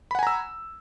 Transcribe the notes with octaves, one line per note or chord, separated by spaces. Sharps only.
F#5 G#5 A#5 B5 E6